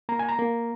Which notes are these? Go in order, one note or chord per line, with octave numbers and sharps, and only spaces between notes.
A#3 A#5
G#5
A#5
A#3